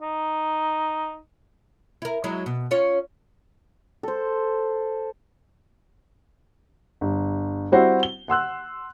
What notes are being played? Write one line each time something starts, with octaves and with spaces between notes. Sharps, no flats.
D#4
E4 A#4
F#3 G#3 E4
B2
C#4 F4 C#5
A4 C5
G1
G3 C4 E4 F#4 C5
G7
F#5 C6 E6 F#6